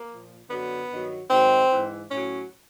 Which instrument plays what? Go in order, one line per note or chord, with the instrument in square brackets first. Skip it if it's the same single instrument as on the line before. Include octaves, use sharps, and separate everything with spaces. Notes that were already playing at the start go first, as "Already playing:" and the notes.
Already playing: [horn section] A#3
A#2 F3
F#2 D3 F#3 B3
G2 D#3 F#3
G#2 D#3 F#3 C4
G#2 E3
A2 F#3 C#4